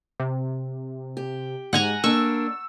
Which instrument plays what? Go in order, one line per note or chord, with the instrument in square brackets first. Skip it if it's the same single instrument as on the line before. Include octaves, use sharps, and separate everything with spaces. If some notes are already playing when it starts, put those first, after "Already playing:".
[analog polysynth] C3
[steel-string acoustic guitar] G4
[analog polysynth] G#2 [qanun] F#5 G#5 A#5
[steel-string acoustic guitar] A#3 D4 [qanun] C#6 [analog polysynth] E6